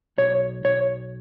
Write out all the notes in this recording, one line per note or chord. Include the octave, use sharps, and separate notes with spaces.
B1 C#5
B1 C#5